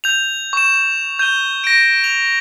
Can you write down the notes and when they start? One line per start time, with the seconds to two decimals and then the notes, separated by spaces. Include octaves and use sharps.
0.04 G6 F7
0.53 C#6 E7
1.19 G6 D#7 G7
1.64 A#6 D7
2.04 F7